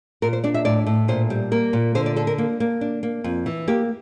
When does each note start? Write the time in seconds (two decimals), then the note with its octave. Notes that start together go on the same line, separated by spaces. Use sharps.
0.22 A#2 A#4
0.33 C5
0.44 D4 D5
0.54 E5
0.65 A2 D5
0.86 A2
1.08 A#2 C5
1.30 G3
1.52 A#3 A#4
1.73 A#2
1.95 D3 C5
2.06 D5
2.16 D4 A4
2.27 A#4
2.38 A#3
2.60 A#3
2.81 D4
3.03 A#3
3.24 F2
3.46 E3
3.68 A#3 G4